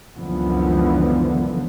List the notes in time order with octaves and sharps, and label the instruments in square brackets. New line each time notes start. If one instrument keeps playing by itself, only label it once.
[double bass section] C#2 F#2 D3 E3 F3 B3